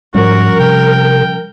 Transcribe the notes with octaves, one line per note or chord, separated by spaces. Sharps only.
G#2 F3 G3 C#4 F#4 A#4
C3 G5